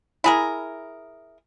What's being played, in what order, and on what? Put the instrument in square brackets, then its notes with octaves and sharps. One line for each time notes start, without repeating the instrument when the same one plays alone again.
[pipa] E4 G#4 A#4